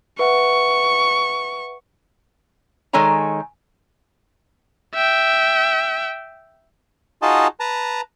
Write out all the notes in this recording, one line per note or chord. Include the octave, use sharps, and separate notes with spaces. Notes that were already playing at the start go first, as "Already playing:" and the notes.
B4 E5 F#5 C#6
D#3 G#3 A4 C#5 G#5 A#5
E5 G5
D#4 F4 F#4 G#4 D#5 A5
B4 A5 A#5